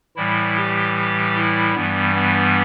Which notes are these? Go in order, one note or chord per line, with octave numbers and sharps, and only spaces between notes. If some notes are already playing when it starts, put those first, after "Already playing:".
A2 E3 G3 E4
G4
E4
G2 E3 G3 B3
B3